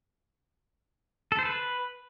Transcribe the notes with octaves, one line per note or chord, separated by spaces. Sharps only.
A4
C5
B4